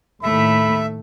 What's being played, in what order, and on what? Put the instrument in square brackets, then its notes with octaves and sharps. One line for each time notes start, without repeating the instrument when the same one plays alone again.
[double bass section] D#2 A2 [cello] A3 [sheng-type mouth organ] E5 [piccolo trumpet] B5